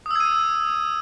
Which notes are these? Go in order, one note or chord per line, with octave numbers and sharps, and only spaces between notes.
D#6 E6 G#6 D#7